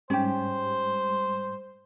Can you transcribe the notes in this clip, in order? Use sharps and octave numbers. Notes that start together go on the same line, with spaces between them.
G#2 G3 G#3 C#4 G4 C5